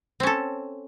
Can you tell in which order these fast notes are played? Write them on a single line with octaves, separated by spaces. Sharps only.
C4 C#4 A4